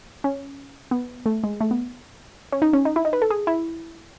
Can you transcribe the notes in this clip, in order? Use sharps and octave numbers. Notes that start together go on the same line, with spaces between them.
C#4
B3
A3
G#3
A3
B3
C#4
D#4
C#4
D#4
E4
D#4
B4
A4
G#4
E4